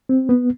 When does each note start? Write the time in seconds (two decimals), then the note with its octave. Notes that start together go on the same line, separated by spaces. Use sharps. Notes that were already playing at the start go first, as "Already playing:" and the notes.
0.09 C4
0.29 B3